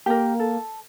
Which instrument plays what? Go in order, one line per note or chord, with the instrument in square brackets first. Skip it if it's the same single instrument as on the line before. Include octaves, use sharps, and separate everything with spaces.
[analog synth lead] A#3 [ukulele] G4 A#4
[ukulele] A4